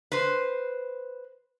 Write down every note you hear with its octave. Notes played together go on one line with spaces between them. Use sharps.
B4 C5